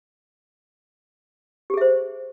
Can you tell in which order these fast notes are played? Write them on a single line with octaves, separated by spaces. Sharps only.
G4 G#4 E5 C5